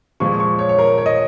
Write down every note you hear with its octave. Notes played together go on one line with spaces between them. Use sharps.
A#2 F3 G#3 C#6
C#6
C#5
C#5
A#4
C#5
D#5